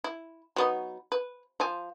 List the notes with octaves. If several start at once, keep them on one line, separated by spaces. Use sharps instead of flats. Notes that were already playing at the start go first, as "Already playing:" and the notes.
E4
F#3 B3 D#4
B4
F3 G#5